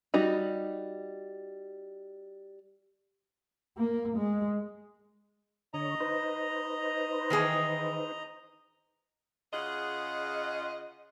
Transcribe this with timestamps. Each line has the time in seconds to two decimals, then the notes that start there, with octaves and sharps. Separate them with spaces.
0.14 G3 D#4 F#4
3.77 A#3
4.17 G#3
5.74 D3 C#5 D#5 A#5
6.00 D#4 B4 C5
7.30 D#3 E3 G#4
9.54 C#3 F4 G#4 D#5 F#5